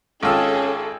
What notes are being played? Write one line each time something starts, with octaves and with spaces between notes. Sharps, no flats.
G#1 C#4 F4 G#4 A4 G5 D#6 E6